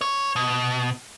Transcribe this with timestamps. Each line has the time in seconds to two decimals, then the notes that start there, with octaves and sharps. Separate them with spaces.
0.01 C#5
0.36 B2